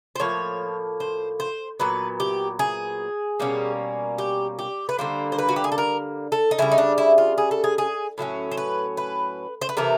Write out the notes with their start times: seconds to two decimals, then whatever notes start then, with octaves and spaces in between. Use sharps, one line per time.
0.16 C5
0.20 A2 F3 A#3 C#5
1.00 C5
1.40 C5
1.79 A#2 F#3 B3 B4
2.20 G4
2.59 G#4
3.40 B2 G3 A#3 C#4
4.18 G4
4.59 G4
4.89 B4
4.98 D3 G3 A#3 C5
5.32 C5
5.38 B4
5.49 F#4
5.56 G4
5.64 G#4
5.72 A4
5.78 A#4
6.32 A4
6.51 D#4
6.58 C#3 E3 G3 E4
6.72 D#4
6.78 D4
6.98 E4
7.18 F4
7.38 G#4
7.51 A4
7.64 G#4
7.78 G#4
8.18 A2 F#3 A#3 C#4
8.51 C5
8.57 B4
8.97 B4
9.62 C5
9.69 B4
9.77 C3 E3 A3 A#4